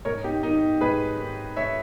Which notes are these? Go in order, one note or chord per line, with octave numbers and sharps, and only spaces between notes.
G#2 A#4 C#5
D#4 G4
D#3 D#4
G#2 G#4 B4
D#3
G#2 C#5 E5